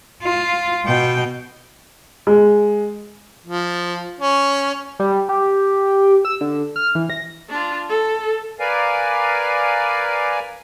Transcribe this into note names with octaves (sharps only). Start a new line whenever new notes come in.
F4
B2 G5
G#3
F3
C#4
G3
G4
E6
D3
F6
E3
A#6
D4 F4
A4
A#4 B4 D5 F5 G#5